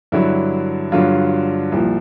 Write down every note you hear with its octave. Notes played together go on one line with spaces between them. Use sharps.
G2 D3 F#3 E4
G2 D3 F#3 F4
C2 A#2 F3